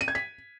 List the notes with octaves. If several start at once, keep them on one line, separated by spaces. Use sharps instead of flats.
D#7
G#6
B6